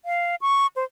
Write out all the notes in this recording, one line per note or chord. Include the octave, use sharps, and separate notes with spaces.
F5
C#6
C5